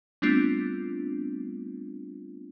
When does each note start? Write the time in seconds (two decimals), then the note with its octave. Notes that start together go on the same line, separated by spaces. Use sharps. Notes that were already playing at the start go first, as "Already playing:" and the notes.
0.22 G3 A3 B3 C4 D4 F4